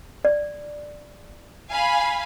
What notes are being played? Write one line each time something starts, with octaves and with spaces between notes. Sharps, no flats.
D5
F5 G#5 B5